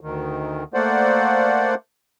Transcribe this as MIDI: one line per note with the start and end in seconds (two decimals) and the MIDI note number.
0.01 0.64 38
0.01 0.64 51
0.74 1.74 57
0.74 1.74 58
0.74 1.74 72
0.74 1.74 74
0.74 1.74 78